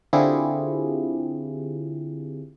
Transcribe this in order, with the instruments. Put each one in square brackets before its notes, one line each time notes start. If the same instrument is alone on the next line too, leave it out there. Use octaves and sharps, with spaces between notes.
[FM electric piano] D3 C4 E4 F4 G4 G#4